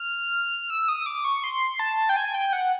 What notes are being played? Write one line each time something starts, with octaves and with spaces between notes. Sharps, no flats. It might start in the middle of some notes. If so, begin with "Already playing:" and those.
Already playing: F6
E6
D#6
D6
C#6
C6
A5
G5
G#5
G5
F#5